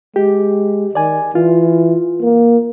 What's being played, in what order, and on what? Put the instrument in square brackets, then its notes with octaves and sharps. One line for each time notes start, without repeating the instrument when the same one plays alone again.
[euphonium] G#3 [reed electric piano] G4
[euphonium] D#3 [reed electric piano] D5 G#5
[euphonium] E3 [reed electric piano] F4
[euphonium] A#3